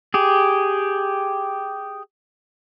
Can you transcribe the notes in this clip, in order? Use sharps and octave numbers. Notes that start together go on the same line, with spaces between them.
G4 G#4